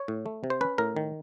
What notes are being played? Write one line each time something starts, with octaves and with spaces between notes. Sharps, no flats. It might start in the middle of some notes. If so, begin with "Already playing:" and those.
Already playing: C#5
A2
A3
C3
C5
C#4 B4
A2 A#4
D#3